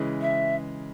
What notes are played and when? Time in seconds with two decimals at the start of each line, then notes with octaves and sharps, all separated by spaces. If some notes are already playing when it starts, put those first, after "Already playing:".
Already playing: C#3 E3 G#3
0.21 E5